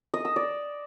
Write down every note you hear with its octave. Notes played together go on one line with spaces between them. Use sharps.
D#5
E6
D5